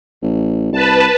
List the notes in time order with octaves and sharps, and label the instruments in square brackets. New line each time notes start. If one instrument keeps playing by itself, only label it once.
[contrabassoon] A1
[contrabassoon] C2 [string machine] B4 A5